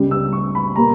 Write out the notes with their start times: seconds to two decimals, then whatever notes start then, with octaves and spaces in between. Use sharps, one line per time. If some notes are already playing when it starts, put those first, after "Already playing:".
Already playing: C#2 C#3 G3
0.11 E6
0.33 C#6
0.55 B5
0.76 A#2 G3 A#3 A#5